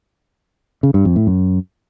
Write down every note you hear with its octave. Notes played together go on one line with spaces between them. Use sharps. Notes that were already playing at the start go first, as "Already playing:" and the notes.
C#3
G2
F2
A2
F#2